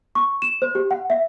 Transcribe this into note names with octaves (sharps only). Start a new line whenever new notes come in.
C#6
E7
C5
G4
F#5
E5